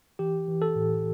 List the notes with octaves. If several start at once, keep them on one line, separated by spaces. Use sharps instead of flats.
E3 G4
E3
A4
A2